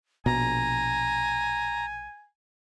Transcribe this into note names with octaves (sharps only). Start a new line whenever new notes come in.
A#1 B2 B3 G#5 A#5